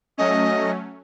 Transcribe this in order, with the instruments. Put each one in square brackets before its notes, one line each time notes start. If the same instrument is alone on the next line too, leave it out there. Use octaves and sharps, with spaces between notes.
[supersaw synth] F#3 A3 C#4 [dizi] D#5